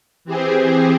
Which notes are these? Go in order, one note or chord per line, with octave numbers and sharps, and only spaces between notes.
E3 C4 G4 G#4 C5